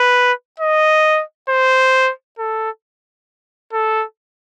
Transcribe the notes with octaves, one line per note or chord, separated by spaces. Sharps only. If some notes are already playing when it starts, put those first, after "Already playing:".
Already playing: B4
D#5
C5
A4
A4